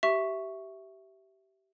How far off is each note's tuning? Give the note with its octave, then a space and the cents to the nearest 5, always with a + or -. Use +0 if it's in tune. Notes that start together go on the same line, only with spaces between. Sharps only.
G4 -25 E5 +0 C#6 +0